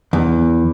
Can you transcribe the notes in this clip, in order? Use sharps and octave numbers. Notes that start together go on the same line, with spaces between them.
E2